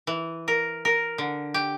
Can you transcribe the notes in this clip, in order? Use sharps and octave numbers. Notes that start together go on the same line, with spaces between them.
E3
A#4
A#4
D3
G4